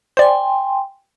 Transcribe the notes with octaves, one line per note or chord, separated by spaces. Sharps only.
C5 D5 G5 G#5 C6